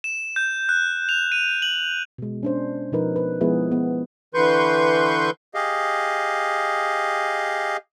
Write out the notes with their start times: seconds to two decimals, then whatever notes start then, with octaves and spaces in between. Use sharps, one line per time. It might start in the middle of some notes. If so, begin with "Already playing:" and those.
0.04 E7
0.36 G6
0.69 F#6
1.09 F7
1.32 D#7
1.62 F#7
2.18 B2 G#3
2.43 C#4 D4 C5
2.92 B2 F3 D#4 A#4 B4
3.16 B4
3.41 F3 G#3 B3 E4 G#4 B4
3.72 B3
4.35 D3 E3 B4 C6 C#6 G6
5.55 G4 G#4 D#5 F5